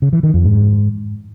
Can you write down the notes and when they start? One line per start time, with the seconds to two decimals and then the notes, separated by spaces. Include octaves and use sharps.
0.02 C#3
0.13 E3
0.23 D#3
0.34 F2
0.44 G#2